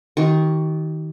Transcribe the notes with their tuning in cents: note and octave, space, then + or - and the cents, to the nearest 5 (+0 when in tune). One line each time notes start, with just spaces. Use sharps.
D#3 +20 G4 -40 C#6 -10